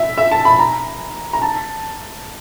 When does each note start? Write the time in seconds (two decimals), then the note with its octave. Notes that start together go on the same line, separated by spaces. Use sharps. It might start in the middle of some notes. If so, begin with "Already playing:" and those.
Already playing: E5
0.18 E5
0.31 A5
0.45 B5
0.59 A#5
1.33 A#5
1.42 A5